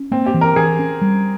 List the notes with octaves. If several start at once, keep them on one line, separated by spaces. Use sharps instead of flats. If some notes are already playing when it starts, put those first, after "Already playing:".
Already playing: C#4
A#3 C4
G4
E3
A#4
E3 G#4
C#4
G3